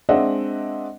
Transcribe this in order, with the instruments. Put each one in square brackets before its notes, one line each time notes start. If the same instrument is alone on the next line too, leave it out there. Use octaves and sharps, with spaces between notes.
[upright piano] G#3 C4 D4 D#5 E5 F#5